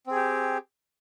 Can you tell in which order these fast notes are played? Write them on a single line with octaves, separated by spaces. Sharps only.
C4 G#4 G4